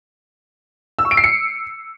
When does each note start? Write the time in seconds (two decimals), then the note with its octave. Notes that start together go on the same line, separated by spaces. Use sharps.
0.99 E6
1.05 C#6
1.11 D7
1.17 C7
1.24 C#7